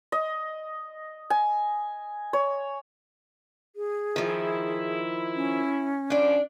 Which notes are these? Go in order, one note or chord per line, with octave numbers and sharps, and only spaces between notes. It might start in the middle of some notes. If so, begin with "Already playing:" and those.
D#5
G#5
C#5
G#4
D#3 F3 E4
C#4
D#3 F3 G3 D4 D5